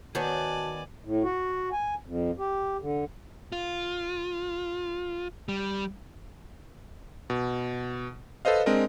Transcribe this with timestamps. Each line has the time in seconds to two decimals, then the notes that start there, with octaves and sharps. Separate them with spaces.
0.15 D#3 B3 F#4 C#5 D5 G#5 A5
1.05 A2
1.23 F#4
1.72 G#5
2.06 F2
2.39 G4
2.80 D3
3.52 F4
5.49 G3
7.30 B2
8.45 A4 B4 C5 D#5 F5
8.66 G#3 C4 D4 A#4 D#5